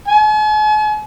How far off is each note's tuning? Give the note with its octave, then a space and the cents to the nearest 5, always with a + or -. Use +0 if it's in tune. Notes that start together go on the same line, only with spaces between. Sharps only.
G#5 +45